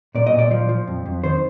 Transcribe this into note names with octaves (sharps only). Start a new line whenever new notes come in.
A#2 D5
D#5
A#2
D5
F3
F3
F2
F2
D#3 C5